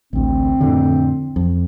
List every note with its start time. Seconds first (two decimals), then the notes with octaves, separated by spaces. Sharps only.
0.13 A1 D2 C4
0.61 F2 A2 D3
1.36 F2